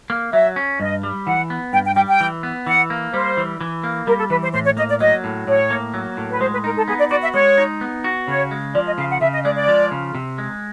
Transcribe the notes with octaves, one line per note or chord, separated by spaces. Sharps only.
A#3
F#3 E5
C#4
G2 D#5
G3
E3 F#5
B3
G2 G5
G5
G3 G5
G5
E3
B3
E3 F#5
A#3
G3 C5
E3
E3
A#3
G3 A#4
A4
E3 B4
C5
A2 C5
C#5
A#3 D#5
D5
F#3 D#5
A2
A2 C#5
A#3
F#3
A2
B4
G#3 C5
B4
D#4 A#4
A4
B3 G#4
D5
F#4 D5
E5
G#3 C#5
D#4
B3
F#4
C#3 C#5
G#3
F3 D5
D#5
C#3 F5
F#5
C#3 E5
D#5
G#3 D5
D5
F3
C#3
C3
G#3